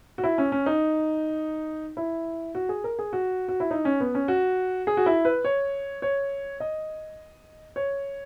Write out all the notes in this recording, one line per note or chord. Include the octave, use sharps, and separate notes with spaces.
F#4
E4
C#4
C#4
D#4
E4
F#4
G#4
A#4
G#4
F#4
F#4
E4
D#4
C#4
B3
C#4
F#4
G#4
F#4
E4
B4
C#5
C#5
D#5
C#5